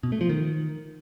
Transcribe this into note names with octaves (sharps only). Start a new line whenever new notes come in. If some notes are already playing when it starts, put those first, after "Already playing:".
B2
A3
F3
D#3